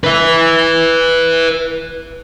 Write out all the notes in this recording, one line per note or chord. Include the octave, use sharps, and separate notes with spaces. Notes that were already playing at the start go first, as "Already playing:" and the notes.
B4 E5